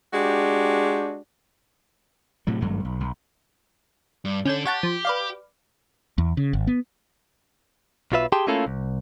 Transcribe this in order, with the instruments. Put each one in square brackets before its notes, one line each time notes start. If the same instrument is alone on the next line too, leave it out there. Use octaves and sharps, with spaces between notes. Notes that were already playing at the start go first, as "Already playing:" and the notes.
[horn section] G#3 D4 F#4 G4
[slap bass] A2 C3 F#3
G#1 G2 F#3 A3
B1
B1
[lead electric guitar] G2
[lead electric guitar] D3 A4 [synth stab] C#4 G6 E7
[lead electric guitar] G4 [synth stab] C#5 F#5 A5
[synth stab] F3
B4 D5 F5
[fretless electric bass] E2
C#3
G#1
B3
[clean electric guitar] B1 F#3 F4 B4 E5
G4 G#4 G5 A5 C6
A3 A#3 C#4 E4 F4 A4
C2